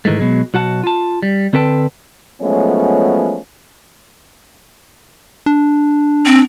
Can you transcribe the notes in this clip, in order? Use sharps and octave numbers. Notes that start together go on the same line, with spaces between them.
G#2 D#3 E3 G#3 A3
B2 F#3 G#3
B1 F#4 F#5 A5
F4 A5
G3
D3 C4 A4 B4 G5 A5
F3 F#3 G#3 A3 B3 C#4
D4
C4